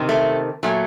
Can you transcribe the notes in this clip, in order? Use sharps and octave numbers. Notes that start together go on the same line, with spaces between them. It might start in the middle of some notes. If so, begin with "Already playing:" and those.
Already playing: C3 D#3
A3
A#2 F#3 A3